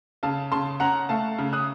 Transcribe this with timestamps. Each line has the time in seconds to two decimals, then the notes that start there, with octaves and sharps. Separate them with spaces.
0.23 C#3 F5 A5
0.52 C#3 A5 C6
0.80 C#4 F#5 A#5
1.09 A3 F5 A5
1.38 C#3
1.53 D#6 F#6